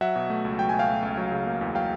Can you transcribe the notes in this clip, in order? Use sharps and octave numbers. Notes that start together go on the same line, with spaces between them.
F#3 E5 F#5
B2
A3
C#2
F#3 G5
B2 G#5
F5 G5
A3
C#2
F#3
C#3
A#3
E2
F#3 F5 G5